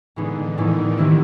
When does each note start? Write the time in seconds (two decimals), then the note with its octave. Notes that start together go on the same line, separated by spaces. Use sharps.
0.16 A2 D3 E3 G#3 B3 D#4
0.58 A2 D#3 E3 G#3 B3 D#4
0.98 D#3 G3 C4 E4